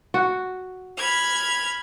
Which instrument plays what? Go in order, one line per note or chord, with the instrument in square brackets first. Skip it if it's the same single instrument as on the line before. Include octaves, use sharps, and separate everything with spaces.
[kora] F#4
[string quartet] B5 F6 G#6